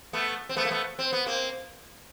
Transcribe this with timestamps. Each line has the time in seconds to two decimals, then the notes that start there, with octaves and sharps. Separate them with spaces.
0.13 A3 B3
0.49 C4
0.56 A3 B3
0.65 A#3
0.71 A3 B3
0.99 C4
1.13 B3
1.26 A#3 C4